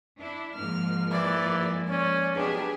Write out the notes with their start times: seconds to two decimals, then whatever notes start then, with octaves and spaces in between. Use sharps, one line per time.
0.17 D4 E4
0.55 G#2 F3 A#3 F6
1.12 E3 D5
1.89 C#4 D5
2.36 B1 D4 G4 G#4 B4